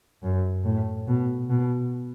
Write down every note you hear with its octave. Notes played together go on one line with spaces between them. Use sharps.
F#2
A2
B2
B2